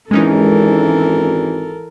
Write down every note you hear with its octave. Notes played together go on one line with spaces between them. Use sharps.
G#1 E3 G#3 C#4 D#4 A4 A#4